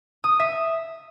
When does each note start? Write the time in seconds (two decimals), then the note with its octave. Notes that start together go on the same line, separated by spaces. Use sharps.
0.24 D#6
0.40 E5